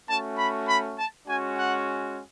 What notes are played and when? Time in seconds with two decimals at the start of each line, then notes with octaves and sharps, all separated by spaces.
0.09 A3 C#4 F#4 A5
0.38 B5
0.67 B5
0.98 A5
1.27 G#3 C#4 F#4 G#5
1.57 F#5